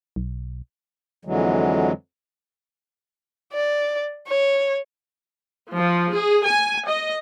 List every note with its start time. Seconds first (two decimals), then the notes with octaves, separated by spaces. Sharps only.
0.16 B1
1.25 F2 D3 E3 F#3 G#3
3.52 D5
4.27 C#5
5.73 F3
6.14 G#4
6.47 G#5
6.87 D#5